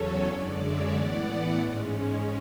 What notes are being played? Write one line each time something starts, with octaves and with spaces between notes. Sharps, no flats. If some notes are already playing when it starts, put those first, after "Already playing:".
Already playing: E2 C#3 F#3 C#4 A4 C#5
F#2 D3 G#3 B4 D5
C#5 E5
A2 E3 B3 D5 F#5
G#2 G#3 C#4